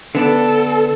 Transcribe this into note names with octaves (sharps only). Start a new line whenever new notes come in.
D3 B3 D4 A4